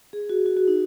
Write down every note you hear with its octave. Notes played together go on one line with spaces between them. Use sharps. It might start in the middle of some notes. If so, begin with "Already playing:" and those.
G#4
F#4
F#4
F#4
D#4